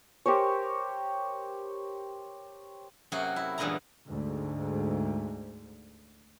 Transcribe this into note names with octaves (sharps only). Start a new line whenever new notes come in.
G4 A#4 C5 C#5
F#2 C3 A#3 F#4 G#4
E4
E2 G2 A#2 G#3 B3 A#5
D2 G#2